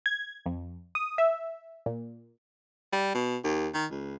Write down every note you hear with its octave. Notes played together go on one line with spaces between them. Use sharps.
G#6
F2
D#6
E5
A#2
G3
B2
D#2
D#3
C#2